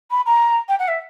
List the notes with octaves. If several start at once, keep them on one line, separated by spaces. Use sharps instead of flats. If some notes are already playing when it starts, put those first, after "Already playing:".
B5
A#5
G5
F#5
E5